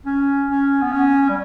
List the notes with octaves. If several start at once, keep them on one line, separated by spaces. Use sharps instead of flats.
C#4
C#4
B3
C#4
G3